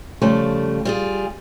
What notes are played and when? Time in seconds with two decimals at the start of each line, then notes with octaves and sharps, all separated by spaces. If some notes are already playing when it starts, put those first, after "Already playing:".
0.22 C#3 F3 G3 A3
0.85 G3 F4 G#4